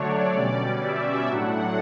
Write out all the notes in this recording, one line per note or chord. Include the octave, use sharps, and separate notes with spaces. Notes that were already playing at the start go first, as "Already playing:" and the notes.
Already playing: D3 F#3 A3 D4 C#5 D5
B2 G3 C#4
E5
A2 F#3 A3 D4 F#5